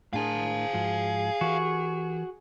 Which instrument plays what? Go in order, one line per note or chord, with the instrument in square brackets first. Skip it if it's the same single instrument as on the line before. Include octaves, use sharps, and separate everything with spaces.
[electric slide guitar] A2 D4 A#4 [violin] G#4 [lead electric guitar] F5 A5
[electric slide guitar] G#2 F3 F#4
[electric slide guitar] E3 G4 A#4 [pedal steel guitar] F#4